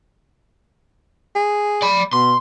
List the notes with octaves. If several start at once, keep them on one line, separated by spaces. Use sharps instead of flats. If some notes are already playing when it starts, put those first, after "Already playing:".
G#4
D5 B5
B2 C6